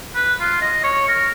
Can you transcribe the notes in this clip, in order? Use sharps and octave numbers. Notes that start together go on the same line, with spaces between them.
B4
F4
D#5
C#5
A#4